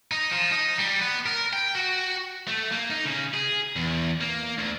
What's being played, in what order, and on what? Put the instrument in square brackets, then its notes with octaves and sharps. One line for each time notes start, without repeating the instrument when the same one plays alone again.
[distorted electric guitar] D#4
F3
D#4
G3
B3
A#4
G5
F#4
A3
A#3
D#4
C#3
G#4
E2
A#3
D2